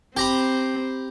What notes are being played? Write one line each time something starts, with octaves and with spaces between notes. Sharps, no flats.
C4 G4 A#5 B5